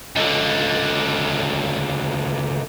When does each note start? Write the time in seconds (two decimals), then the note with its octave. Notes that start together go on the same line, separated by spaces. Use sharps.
0.16 C#2 D3